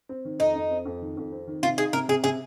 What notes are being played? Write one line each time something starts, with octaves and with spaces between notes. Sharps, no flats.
C4
D#3
F2 D#4
F2
C4
F2
D#3
F2
C4
D#3
C3 F4
D#4 G#4
C3 A#4
C3 G#4
C3 G#4